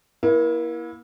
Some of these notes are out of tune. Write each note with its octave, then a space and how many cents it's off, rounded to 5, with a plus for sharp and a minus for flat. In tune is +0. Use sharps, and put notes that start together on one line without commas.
A#3 +35 E4 +0